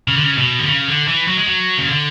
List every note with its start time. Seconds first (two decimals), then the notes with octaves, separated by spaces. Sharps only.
0.08 C#3
0.16 D3
0.23 C#3
0.38 B2
0.59 D3
0.68 C#3
0.88 D3
1.08 E3
1.28 F#3
1.37 G#3
1.47 F#3
1.78 C#3
1.89 D3